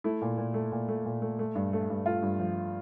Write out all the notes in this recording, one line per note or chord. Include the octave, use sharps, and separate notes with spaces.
A3 E4
A#2
A#2
A3
A#2
A3
A#2
A3
A3
G2
A3
G2
A3 F4
G2
F3